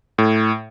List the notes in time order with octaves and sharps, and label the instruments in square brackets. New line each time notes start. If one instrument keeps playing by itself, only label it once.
[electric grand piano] A2